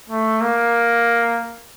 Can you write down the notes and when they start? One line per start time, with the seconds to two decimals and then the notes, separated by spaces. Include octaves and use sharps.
0.10 A3
0.41 A#3